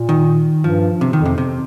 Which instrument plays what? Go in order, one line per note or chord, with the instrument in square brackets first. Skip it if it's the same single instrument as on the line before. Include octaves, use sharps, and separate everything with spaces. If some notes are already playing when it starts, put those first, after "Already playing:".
Already playing: [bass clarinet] A#2
[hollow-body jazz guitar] D#3
[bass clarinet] G2 [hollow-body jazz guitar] F3
[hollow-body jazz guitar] C3
D#3
[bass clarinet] F2
[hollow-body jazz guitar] C3
C3